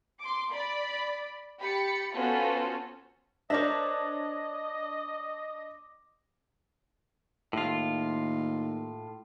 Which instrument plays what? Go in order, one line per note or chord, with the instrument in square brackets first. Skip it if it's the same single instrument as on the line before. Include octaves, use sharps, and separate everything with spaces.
[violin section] C6 D6
D5 B5
G4 B5 A6 C#7
B3 C#4 F4 F#4 A4 C5
[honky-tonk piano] D4 C#5 [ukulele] A#4 C5 E5 [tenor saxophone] D#5 [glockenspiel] D6 A#6
[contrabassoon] D#2 [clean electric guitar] A2 F4